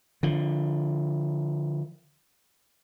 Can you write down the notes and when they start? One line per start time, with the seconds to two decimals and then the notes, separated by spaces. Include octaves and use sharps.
0.23 D3 F3